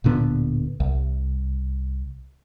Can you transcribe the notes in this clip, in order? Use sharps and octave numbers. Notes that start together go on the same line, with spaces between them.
D1 A#2 D3 B3
C2